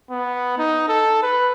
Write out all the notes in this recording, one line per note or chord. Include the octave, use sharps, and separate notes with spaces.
B3
D#4
A4
B4